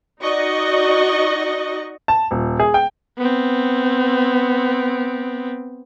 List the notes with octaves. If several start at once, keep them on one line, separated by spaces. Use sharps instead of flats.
D#4 F#4 D5 D#5 C#6
A5
D#1
G#4
G5
B3 C4